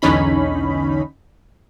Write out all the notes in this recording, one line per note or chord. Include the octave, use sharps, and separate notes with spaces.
B1 E2 D3 C#4 D#4 B5